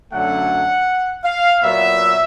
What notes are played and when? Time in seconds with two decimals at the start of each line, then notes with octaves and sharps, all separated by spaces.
0.13 F#2 D3 F#3 A3 F#5
1.24 F5
1.62 A#2 F#3 B3 E5